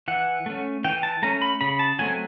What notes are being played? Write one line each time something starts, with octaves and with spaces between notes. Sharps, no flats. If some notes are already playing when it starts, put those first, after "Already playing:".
E3 F#5
A3 C#4
E3 G5
A5
A3 C#4 A#5
B5
C#3 B5
A5
F#3 A3 C4 G#5